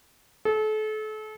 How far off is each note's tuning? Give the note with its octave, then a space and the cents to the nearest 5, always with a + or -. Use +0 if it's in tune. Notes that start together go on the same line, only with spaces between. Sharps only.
A4 -35